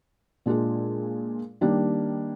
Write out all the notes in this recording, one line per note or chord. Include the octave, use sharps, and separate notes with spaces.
A#2 G#3 D4 F4 G#4
D#3 G3 A#3 D4